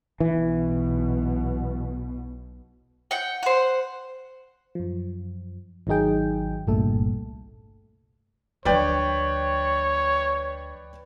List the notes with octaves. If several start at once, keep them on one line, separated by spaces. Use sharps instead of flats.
B1 B2 E3
F#5 G5
C5 F#5
F#2 F3
G#1 D#3 F#3 D#4 G#4 G5
G1 C2 G2 A#2 A3 A4
D2 F3 B4 C#5 D5 G5